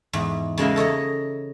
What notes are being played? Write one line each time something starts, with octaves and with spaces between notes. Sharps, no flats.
E2 G#2
C#3 G#3 A#3 E4
A4 C#5 D#5 A#5